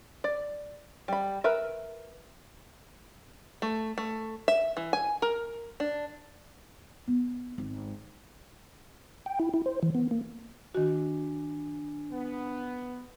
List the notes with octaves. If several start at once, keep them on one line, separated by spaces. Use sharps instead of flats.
D5
G3 B5
A#4 B4 E5
A3
A3
E5
E3
G#5
A#4
D4
B3
G#1
G5
E4
E4
C5
E3
B3
A#3
D#3 D4 F#4 G#5
B3